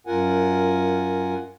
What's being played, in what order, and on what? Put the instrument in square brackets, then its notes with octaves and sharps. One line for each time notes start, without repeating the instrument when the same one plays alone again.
[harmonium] F#2 F4 A#4 F#5 G#5